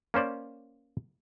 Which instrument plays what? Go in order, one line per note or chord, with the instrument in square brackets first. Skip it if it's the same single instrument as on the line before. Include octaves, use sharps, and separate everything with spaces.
[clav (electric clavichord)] A#3 C#4 C5 D5